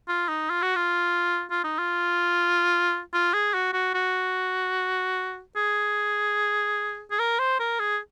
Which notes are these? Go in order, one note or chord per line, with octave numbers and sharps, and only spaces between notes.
F4
D#4
F4
F#4
F4
F4
D#4
F4
F4
G#4
F#4
F#4
F#4
G#4
G#4
A#4
C5
A#4
G#4